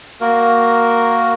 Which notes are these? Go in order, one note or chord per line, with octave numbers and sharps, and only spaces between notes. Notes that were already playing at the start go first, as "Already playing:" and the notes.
A#3 F#4 A#4